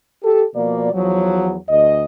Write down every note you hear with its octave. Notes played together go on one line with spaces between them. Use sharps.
G4 A4
B2 F3 A#3 D5
E2 F3 F#3
D2 D#5